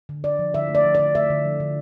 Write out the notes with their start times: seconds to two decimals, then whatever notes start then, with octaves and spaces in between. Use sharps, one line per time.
0.09 D3
0.24 D3 D5
0.39 F3
0.54 D3 E5
0.69 A3
0.75 D5
0.85 F3
0.95 D3 D5
1.15 A3 E5
1.30 D3
1.45 F3
1.60 D3